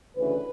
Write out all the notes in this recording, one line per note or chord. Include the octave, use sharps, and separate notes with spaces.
D2 C#3 E3 A3 B4